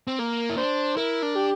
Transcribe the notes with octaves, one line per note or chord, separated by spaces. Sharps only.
C4
A#3 A#4
E4
D4 C5
E4 A#4
D4
G4